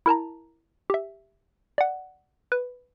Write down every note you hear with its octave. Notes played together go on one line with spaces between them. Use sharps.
E4 A#4 A5 A#5
G4 E5
D5 F#5
B4